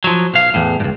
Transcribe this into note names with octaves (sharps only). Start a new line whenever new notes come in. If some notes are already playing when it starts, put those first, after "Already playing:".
F3 F#3
B1 F5
E2 A2
C#2 G2